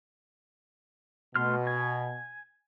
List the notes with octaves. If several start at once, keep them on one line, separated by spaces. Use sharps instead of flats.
B2 A3 C6 F6
G#5